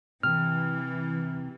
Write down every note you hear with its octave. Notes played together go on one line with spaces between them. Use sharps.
C3 E3 F6